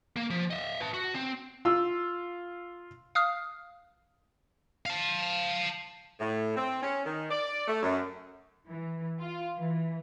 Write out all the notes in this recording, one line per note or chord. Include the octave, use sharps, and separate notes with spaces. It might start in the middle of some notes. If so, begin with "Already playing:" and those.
A#3
F3
D#5 E5
B4 A5
F#4
C4
F4 E6
F5 D#6 F6
F5 A5
A2
C4
C#4
D#3
D5
A3
F#2
E3
F4
E3